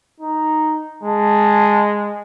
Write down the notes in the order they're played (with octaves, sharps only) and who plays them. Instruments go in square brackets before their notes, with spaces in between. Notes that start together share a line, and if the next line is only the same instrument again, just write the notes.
[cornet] D#4
[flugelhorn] G#3 [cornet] A5